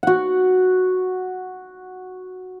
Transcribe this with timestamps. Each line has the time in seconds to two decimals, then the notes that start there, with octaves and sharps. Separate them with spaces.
0.03 F#4 F#5